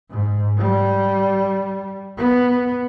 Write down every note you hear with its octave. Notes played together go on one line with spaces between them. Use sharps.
G#2
G3
B3